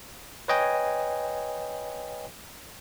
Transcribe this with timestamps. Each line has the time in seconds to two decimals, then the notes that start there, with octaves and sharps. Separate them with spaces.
0.48 B4 C#5 D#5 G5 G#5